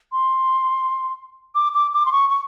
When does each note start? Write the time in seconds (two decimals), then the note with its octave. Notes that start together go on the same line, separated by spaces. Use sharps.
0.12 C6
1.55 D6
1.74 D6
1.94 D6
2.06 C6
2.12 C#6
2.29 C#6